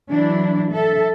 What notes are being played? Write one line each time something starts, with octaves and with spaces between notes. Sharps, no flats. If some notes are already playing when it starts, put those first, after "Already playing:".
E3 F#3 D4 E4
A4 E5